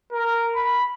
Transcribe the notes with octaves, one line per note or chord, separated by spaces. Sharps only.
A#4
B5